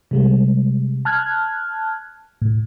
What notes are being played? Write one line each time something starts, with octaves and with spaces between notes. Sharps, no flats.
C3 G3 G#3
A5 F6 F#6 G#6
A2